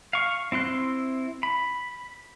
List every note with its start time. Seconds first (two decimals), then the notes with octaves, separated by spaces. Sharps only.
0.13 F5 C#6
0.52 C4 E4 C6 F#6
1.43 B5